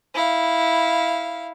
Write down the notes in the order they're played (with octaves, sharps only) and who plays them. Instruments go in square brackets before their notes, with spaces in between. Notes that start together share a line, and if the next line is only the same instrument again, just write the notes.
[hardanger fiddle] E4 F5